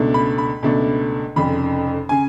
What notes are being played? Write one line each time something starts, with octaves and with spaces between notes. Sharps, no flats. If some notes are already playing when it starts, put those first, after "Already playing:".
Already playing: C#2 B2 A3 D4
B5
B5
C#2 B2 A3 D4
F1 F2 C#3 B5
C#3 G#5